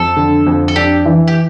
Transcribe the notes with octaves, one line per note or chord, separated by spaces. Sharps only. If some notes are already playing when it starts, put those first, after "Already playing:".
Already playing: F2 A4
D3
F2
A4
D4 G4
E3
G4